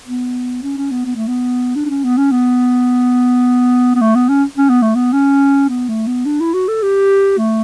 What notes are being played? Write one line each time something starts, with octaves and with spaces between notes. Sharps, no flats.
B3
C#4
C#4
B3
B3
A3
B3
D4
D4
C#4
B3
C#4
B3
B3
A3
B3
C#4
C#4
B3
A3
B3
C#4
B3
A3
B3
D4
E4
F#4
A4
G4
A3